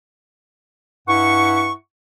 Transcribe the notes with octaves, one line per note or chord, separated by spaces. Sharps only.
G2 E4 F#5 C#6